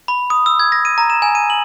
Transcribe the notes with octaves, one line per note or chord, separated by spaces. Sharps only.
B5
D#6
E6
G#6
A#6
D#7
A#5
E7
G#5
D#7
F#7